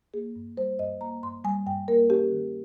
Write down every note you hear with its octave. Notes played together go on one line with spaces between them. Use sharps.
A#3 G#4
G2
G3 C5
G2 D#5
A#3 A#5
G2 C6
G3 G#5
G2 G5
A#3 A#4
C#4 G4
D#3